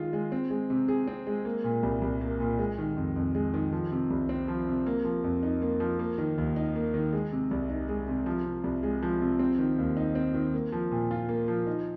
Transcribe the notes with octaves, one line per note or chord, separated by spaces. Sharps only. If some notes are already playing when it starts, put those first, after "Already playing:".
Already playing: D#3 G#3 F4 G#4
G#3
C4
G#3
C3
G#4
C4
G#3
A#3
A#2
C2
C2
A#3
A#2
G#3
D#3
F2
F2
G#3
D#3
F3
C3
C2
C4
F3
C3
A#3
F3
F2
D#4
A#3
F3
A#3
D#3
D#2
D#4
A#3
D#3
G#3
C3
C2
D#4
G#3
C3
F3
C3
C2
G#3
F3
C3
C4
D#3
D#2
D#4
C4
D#3
A#3
F3
A#2
F4
A#3
F3
D#4